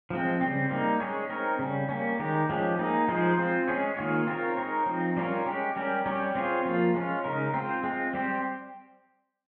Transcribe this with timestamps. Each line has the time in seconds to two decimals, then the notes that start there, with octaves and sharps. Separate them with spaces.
0.10 F3 G#3 C4
0.41 C#3 G3 C4
0.71 G3 A#3 D#4
1.00 G#3 C#4 G#4 C#5
1.30 C4 D#4 A#4 C#5
1.59 C#3 G3 C#4
1.89 G3 A#3 C#4
2.19 D#3 G#3 D#4 G4
2.49 F3 G#3 C#4 G4
2.79 A#3 D#4 G#4
3.08 F3 G#3 D#4 G#4 C5
3.38 C4 F4 C5
3.68 G#3 C#4 G#4 C#5
3.97 D#3 A#3 F4 G#4 C#5
4.27 C4 F4 A#4 C#5
4.57 G#3 D#4 A#4 C#5
4.86 F3 C4 D#4
5.16 G3 C#4 F4 A#4 C#5
5.46 G#3 C#4 G4
5.76 G3 C#4 G4 A#4
6.06 G3 C#4 G4 C#5
6.35 C4 F4 G#4 C#5
6.65 F3 A#3 F4
6.94 G#3 C#4 F4
7.24 C#3 G#3 D#4 A#4
7.54 C4 F4 C5
7.83 G#3 C4 F4
8.13 G3 C4 G4 C5